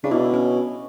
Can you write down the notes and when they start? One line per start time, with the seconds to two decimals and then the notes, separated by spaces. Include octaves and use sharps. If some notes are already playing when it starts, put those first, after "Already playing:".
0.04 C#3 D4
0.11 B2 E4
0.34 C#4